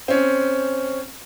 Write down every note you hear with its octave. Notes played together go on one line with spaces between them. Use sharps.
C4 C#4